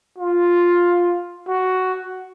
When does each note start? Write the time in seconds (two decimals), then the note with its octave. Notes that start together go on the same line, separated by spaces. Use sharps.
0.18 F4
1.48 F#4